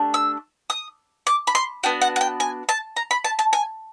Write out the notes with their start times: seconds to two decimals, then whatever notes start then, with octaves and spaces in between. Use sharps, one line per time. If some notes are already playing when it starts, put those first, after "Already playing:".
Already playing: A3 D4 G4
0.14 E6
0.70 D#6
1.27 D6
1.47 B5
1.55 C6
1.83 B3 D4 F#4 G5
2.01 F#5
2.16 F#5
2.21 G5
2.40 G#5
2.69 A5
2.96 A#5
3.11 B5
3.24 A5
3.39 A5
3.53 G#5